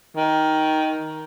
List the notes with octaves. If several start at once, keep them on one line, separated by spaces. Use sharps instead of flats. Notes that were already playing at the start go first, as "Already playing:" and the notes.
D#3